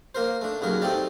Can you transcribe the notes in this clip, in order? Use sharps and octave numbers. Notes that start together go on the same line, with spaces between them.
A#3 A#4 C5
A3 D4
D#2 C#3 F#3 A#4
A3 C4 D#4 G4 D5